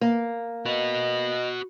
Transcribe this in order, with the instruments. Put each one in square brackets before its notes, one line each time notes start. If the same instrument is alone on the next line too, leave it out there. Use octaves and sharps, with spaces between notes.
[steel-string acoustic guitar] A#3
[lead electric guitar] F#4 B4 [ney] D#5